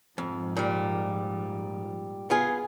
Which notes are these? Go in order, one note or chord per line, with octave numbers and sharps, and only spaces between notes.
F2 G#2 F3
A#2 G3
B3 F4 G#4